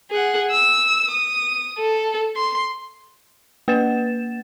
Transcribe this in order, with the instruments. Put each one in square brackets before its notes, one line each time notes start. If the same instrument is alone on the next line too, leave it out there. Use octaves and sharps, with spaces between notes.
[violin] G#4 F#5
E6
D#6
A4
C6
[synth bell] A#3 B4 A6 E7